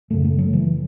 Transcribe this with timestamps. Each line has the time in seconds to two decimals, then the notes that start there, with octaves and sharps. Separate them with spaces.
0.10 F#1 F#2 C#3 A3
0.25 A3
0.39 F#3
0.53 E3